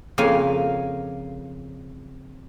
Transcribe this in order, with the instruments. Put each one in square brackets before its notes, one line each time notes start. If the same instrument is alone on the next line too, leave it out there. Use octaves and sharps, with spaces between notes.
[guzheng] F2 C#3 A#3 F5 G#5